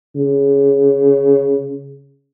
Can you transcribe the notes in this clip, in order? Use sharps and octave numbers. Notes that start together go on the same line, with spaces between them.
C#3